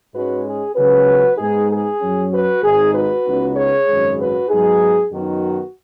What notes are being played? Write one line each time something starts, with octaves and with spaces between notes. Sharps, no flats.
G#2 G#3 C#4 F#4 B4
G#4
C#2 C#3 F#3 C#4 F#4 B4
G#2 G#3 B3 D#4 G#4
G#4
F#2 F#3 C#4
F#4 B4
G#1 G#2 G#3 D#4 G#4
F#4 B4
C#2 C#3 B3 D#4
G#4 C#5
G#1 F#2 C#3 G#3
F#4 B4
G#2 F#3 B3 D#4 G#4
F#2 D#3 B3 D#4 F#4